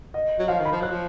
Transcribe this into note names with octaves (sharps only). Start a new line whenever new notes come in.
D#5
F#3
F3 F5
D#3
B5
F3
F#3 F#6
F3